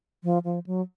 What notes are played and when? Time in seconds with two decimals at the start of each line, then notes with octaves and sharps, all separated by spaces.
0.24 F3
0.44 F3
0.66 F#3